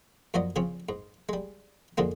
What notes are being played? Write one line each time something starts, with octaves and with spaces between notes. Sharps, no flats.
F#2 F3 F#3 D5 D#5
C#3 F3 C4 C#4
G#2
G3 G#3
F2 G#2 D3 G#3 A#3